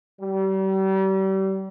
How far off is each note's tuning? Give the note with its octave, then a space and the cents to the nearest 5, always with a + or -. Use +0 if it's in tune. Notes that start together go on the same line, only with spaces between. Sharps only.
G3 -35